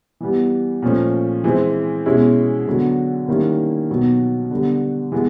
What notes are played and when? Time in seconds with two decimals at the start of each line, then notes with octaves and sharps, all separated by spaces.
0.20 E3 G3 B3
0.82 A#2 F3 A3 C#4
1.44 E3 G#3 C4 E4
2.06 B2 G#3 C#4 E4
2.67 D3 F#3 B3
3.28 D#3 G3 A#3 C#4 E4
3.90 B2 F#3 B3 D#4
4.51 D3 G3 B3
5.12 E3 G#3 B3